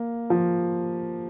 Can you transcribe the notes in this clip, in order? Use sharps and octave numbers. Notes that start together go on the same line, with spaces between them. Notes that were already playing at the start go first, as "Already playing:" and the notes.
Already playing: A#3
F3